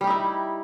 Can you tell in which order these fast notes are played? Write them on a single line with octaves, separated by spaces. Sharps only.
G3 G4 D#4 E4